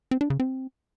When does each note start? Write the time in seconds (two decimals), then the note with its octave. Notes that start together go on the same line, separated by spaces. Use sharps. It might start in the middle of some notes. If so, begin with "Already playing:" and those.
0.11 C4
0.21 D4
0.30 C#3
0.40 C4